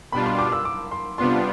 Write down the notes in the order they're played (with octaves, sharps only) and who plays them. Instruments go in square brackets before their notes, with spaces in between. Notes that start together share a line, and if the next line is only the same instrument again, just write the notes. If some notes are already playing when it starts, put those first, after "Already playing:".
[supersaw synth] B2 G3 D4 F4 [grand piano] B5
[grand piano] C6
D6
E6
D6
C6
[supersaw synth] C3 G3 B3 D4 F4 [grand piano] C6